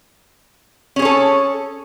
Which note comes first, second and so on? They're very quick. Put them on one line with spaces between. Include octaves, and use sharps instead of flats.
C#4 G#4 C#5 A4